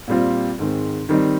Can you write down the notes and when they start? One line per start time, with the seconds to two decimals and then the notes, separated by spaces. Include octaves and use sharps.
0.08 A#2 G3 C4 F4
0.59 G#2 D#3 G#3 C4
1.09 D#3 G3 C4 D#4